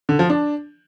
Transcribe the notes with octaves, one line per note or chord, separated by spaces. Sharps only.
D3
F3
D4